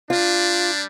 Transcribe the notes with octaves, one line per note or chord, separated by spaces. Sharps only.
G3 D4 F4